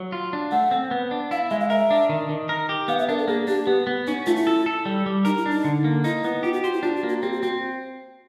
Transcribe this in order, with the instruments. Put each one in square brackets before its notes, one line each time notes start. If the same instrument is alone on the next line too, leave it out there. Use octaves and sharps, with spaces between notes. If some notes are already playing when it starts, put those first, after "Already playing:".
Already playing: [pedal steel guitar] F#3
F4
D4
[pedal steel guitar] A3 [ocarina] F#5
[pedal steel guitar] C4
B3
D4
[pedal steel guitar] E4 [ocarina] F5
[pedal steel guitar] G#3 [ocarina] E5
[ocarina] F5
[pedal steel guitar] A#4 [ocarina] E5
[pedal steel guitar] D4
D#3
D#3
A#4
G4
[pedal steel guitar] B3 [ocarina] F5
[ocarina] E5
[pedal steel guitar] D4 [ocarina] A#4
[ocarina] A4
[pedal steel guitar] A#3 [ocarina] G#4
[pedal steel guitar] D4 [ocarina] G4
[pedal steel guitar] B3
B3
[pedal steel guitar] C#4 [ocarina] D#4
[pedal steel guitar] A3 [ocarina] F4
[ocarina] E4
[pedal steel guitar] A4
A4
G3
G3
[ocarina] D#4 [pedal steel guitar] A#4
[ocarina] E4
[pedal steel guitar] D4
[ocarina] D#4
[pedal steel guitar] D3
A#3
[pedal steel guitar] D#4 [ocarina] E4
[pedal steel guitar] B3 [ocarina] E4
[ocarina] F4 [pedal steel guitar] G4
[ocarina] F#4
[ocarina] F#4 [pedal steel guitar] C5
[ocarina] E4
[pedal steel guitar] D4 [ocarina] F4
[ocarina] F#4
[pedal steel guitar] A#3
[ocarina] F#4
[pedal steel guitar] C4 [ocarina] G4
[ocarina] F#4
[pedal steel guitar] C4 [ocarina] F#4